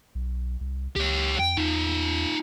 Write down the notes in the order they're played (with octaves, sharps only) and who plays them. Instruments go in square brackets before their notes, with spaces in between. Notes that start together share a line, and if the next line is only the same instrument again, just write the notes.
[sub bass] B1
C2
[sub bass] C#2 [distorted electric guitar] G4 C#5
[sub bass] F2 [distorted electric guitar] G5
[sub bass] E2 [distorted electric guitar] D#4 F4